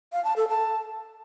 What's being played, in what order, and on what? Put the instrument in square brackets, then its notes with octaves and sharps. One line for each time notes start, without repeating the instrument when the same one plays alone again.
[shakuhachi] F5
A5
A4
A5